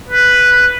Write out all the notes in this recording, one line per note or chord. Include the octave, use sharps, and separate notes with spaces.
B4